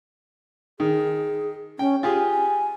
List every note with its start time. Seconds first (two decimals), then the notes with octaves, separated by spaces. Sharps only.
0.80 D#3 G#4
1.79 C#4 G5
2.03 F4 G4 G#4 G#5